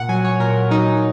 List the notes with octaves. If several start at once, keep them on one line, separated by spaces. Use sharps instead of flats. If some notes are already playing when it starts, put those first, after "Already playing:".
Already playing: A#2 F#5
F#3 G#5
C#5
A#2 A#4
F#3 D#4